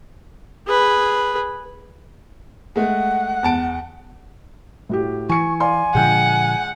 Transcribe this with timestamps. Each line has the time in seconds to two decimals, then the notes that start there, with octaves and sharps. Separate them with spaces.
0.67 G#4 B4
2.76 G#3 A3 F#5
3.43 E2 A5 D7
4.89 A2 F#4 G4
5.29 E3 G#5 C#6 C#7
5.60 D5 F5 G#5 C6
5.95 A#2 D3 F3 G#3 F#5 G5 G6